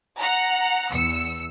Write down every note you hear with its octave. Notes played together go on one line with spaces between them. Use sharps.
F#5 A#5
E2 E6 C#7